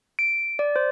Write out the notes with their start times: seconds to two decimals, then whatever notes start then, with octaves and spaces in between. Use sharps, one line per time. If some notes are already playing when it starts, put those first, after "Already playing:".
0.19 D7
0.59 D5
0.76 C5